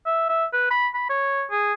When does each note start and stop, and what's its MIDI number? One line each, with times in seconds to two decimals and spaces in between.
0.06 0.28 76
0.29 0.45 76
0.53 0.68 71
0.71 0.88 83
0.94 1.07 83
1.09 1.44 73
1.51 1.73 68